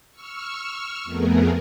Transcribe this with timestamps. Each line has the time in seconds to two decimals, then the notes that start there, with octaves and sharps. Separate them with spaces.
0.11 C#6 E6 F6
1.04 F2 A3 B3 G#4 A#4